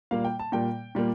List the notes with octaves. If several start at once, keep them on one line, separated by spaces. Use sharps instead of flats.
A#2 G3 A#3 F5
G5
A5
A#2 G3 A#3 G5
A#2 G3 A#3